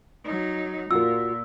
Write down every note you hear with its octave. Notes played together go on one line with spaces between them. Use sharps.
F#3 D#4
A#2 F4 F#4 A#4 E6